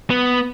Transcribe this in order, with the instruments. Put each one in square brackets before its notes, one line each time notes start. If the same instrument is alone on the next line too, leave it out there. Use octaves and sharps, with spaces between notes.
[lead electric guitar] B3